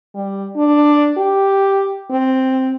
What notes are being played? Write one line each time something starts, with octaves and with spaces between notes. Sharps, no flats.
G3
D4
G4
C4